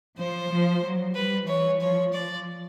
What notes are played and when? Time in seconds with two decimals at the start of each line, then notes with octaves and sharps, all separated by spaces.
0.18 F3 C5
0.51 F3
0.83 F#3
1.15 G3 B4
1.47 E3 C#5
1.80 F3 C#5
2.13 F3 D5